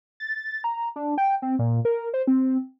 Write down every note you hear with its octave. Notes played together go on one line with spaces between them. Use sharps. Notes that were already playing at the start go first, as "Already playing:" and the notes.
A6
A#5
D4
G5
C4
A#2
A#4
C5
C4